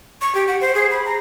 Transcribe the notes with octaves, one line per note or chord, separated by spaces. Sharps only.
C#6
G4
F#5
C5
G#4
B5
A#5